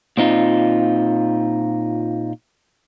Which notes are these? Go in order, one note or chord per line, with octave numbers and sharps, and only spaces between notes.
A#2 C4 D#4 F4